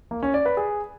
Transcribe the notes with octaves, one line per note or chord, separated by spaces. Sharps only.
A#3
C#4
D5
B4
G#4